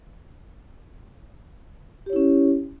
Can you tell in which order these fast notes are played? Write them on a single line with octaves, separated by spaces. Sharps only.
G4 C#5 E4 C#4